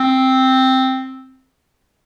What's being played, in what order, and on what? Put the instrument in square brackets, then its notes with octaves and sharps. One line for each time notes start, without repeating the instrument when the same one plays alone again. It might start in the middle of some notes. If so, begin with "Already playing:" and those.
Already playing: [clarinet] C4